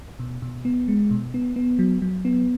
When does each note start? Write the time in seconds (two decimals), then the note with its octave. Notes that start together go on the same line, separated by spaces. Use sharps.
0.19 B2
0.42 B2
0.65 B3
0.88 G#3
1.11 B2
1.34 B3
1.56 B3
1.79 F#3
2.02 F#3
2.25 B3